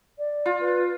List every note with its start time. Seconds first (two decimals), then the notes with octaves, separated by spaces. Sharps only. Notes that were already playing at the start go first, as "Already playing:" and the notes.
0.18 D5
0.46 F4
0.61 B4